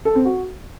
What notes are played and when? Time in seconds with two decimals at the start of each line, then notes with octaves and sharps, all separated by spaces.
0.05 A4
0.15 C4
0.25 F#4